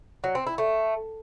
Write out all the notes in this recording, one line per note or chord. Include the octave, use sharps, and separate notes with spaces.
F#3
C4
E4
A3